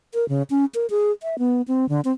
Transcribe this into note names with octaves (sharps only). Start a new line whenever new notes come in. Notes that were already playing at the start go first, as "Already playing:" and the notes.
A#4
C#3
C#4
A#4
G#4
E5
B3
C4
D3
C4